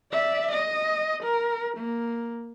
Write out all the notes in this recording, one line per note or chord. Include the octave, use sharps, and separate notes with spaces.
D5 E5
D#5
A#4
A#3